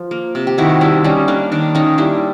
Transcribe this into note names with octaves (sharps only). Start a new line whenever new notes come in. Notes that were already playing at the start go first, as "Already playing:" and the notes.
Already playing: F3
A#3
C3
G4
D#3 E4 F#4
G3 D4 E4
G3 C#4 D#4
A#3 D4
D#3 D4
A#3 C#4 D#4
G3 D4 E4